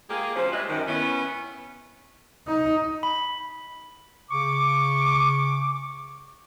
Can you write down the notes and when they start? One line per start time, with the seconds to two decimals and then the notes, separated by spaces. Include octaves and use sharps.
0.10 G#3 A#3 F4 G4 G#4
0.35 D2 F3 C4 C#4 C5
0.52 G3 G#3 D4 B4 D#5 E5
0.68 F#2 D#3
0.86 B3 C#4 E4
2.48 D#4
3.03 B5
4.31 C#3 C#6 D6